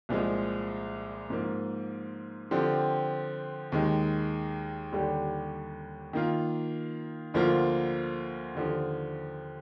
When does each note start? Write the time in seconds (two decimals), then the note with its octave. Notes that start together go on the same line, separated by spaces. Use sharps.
0.09 C2 A#2 F3 G#3
1.30 G#2 F3 A#3
2.51 D3 F3 C4 G4
3.72 D#2 D#3 G#3
4.92 D#2 D3 G3 D4 G4
6.13 D#3 A#3 F4
7.34 D2 D3 F3 A#3 F4
8.55 D#2 D3 F3